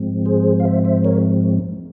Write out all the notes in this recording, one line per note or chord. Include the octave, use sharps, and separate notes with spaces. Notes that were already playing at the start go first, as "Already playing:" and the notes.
Already playing: G#2 F3 G#3 C4
G#4 C5
F5
C5 E5
C5 E5
A#4 C#5